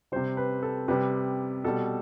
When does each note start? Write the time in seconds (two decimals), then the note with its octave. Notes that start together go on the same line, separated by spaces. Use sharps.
0.12 C3 G3 C5
0.37 B4
0.63 A4
0.88 C3 G3 B4
1.64 B2 G3 A4